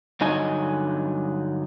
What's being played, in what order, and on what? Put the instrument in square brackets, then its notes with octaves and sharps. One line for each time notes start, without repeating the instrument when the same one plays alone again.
[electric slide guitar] G2 D3 F#3 D#4 D#5 G#5